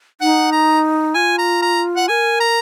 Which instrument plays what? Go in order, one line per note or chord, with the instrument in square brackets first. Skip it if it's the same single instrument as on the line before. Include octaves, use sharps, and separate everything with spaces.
[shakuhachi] D#4 [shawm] F#5
[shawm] A#5
[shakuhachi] F4 [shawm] G#5
[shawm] A#5
A#5
F#5
[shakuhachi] A#4 [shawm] G#5
[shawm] A#5